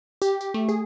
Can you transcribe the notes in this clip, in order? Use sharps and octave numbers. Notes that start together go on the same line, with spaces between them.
G4
G4
A3
G#4